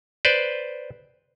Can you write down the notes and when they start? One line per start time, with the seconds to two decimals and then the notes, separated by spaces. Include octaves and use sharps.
0.25 B4 C5 D5